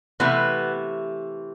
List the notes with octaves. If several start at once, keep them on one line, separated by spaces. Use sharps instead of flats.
C3 E3 A3 B3